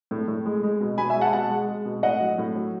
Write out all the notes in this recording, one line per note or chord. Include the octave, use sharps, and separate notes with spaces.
A2
A2
G#3
G#3
B2
B2 G#5 B5
E5 G#5
G#3
F#5 A5
B2 F#5 A5
G#3
G#3
B2
A2 D#5 F#5
F#3
A2
F#3